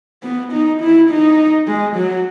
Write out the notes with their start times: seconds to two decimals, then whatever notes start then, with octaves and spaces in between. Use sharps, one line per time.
0.23 B3
0.52 D#4
0.80 E4
1.10 D#4
1.67 G#3
1.96 F#3